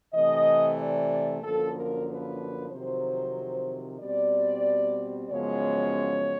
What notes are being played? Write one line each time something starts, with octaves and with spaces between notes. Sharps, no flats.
C3 E3 A3 D#5
D5
F#2 D3 F3 A#3 A4
A#4
B4
F2 C3 D#3 F#3 C5
B2 G3 C4 D5
F#2 C#3 F3 G#3 B3 C#5